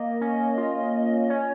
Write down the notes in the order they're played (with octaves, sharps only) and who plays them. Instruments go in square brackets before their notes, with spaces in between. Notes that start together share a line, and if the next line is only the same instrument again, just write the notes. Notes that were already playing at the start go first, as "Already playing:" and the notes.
Already playing: [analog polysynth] A#3 [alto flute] D#5
[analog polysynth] C#4
F4
[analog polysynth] C#4 [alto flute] C#5